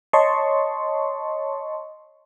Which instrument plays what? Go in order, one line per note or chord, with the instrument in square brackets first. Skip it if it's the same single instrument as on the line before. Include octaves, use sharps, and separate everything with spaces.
[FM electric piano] C#5 D#5 A5 C6 C#6